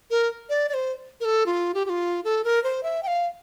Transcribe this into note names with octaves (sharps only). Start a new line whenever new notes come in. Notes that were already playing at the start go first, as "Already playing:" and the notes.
A#4
D5
D5
C5
A#4
A4
F4
G4
G4
F4
A4
A#4
C5
E5
G5
F5